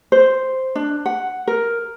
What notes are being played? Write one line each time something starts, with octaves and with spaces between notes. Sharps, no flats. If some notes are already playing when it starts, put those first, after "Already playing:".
C5
D4
F#5
A#4